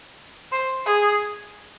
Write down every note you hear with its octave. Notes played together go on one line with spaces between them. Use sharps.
C5
G#4